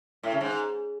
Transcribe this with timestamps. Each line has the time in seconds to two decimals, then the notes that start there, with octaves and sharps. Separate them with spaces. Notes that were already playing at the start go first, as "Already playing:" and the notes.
0.23 A2
0.32 C#3
0.41 G#2